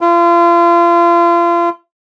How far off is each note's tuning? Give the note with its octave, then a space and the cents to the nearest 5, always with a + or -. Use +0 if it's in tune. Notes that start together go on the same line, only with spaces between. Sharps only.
F4 -35